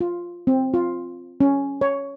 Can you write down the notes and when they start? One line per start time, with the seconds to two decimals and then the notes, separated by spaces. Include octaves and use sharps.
0.01 F4
0.47 C4
0.74 F4
1.40 C#4
1.81 C#5